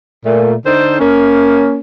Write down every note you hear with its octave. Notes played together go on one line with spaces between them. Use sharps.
A#2 A3
D3 D#4 A4 C5
A#3 C#4